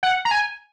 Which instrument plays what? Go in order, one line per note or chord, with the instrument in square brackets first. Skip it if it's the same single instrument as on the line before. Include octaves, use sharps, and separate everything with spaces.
[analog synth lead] F#5
A#5
G#5